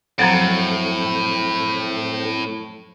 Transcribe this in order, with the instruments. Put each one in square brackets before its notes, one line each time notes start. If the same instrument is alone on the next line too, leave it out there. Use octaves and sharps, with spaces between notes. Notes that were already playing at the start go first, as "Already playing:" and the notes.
[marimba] F#2 F3 F#3 [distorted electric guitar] A2 [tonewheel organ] C4 A4 G5